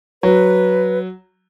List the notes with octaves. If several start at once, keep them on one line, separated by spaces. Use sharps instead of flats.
F#3 B4